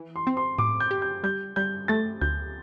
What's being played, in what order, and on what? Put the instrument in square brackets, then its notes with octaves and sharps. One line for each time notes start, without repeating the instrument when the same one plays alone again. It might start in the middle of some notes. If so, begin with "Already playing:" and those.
Already playing: [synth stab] E3
[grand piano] C6
[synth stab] C4
[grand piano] C6
[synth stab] A2 [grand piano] D6
[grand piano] G6
[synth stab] G4
[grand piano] G6
[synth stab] G3 [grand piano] G6
[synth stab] G3 [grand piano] G6
[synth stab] A3 [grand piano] A6
[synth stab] D2 [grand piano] G6